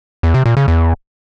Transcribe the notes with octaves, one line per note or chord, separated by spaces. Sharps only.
E2
C3
A#2
C#3
E2